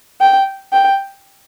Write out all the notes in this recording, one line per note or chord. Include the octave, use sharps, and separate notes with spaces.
G5
G5